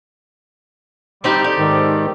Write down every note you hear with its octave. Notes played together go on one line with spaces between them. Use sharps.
D3 G3 C4 D#4 G4
G4 A4 D5
G#2 D#3